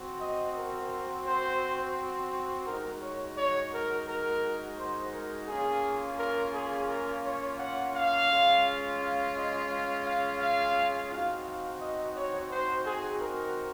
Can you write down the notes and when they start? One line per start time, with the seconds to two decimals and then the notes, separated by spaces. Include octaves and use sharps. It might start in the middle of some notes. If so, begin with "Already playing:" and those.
Already playing: C4 F#4
0.21 D#5
0.56 A#4
1.27 C5
2.67 G#3 D#4 F#4 A#4
3.02 C#5
3.38 C#5
3.73 A#4
4.08 A#4
4.78 C5
5.13 A#4
5.48 A#3 C#4 F4 G#4
6.19 A#4
6.54 G#4
6.88 A#4
7.24 C#5
7.59 F#5
7.95 F5
8.30 G#3 C#4 F4
8.99 F5
9.35 D#5
9.70 F5
10.06 F5
10.40 F5
11.11 C4 D#4 F#4 F5
11.46 F5
11.81 D#5
12.16 C#5
12.51 C5
12.87 G#4
13.21 A#4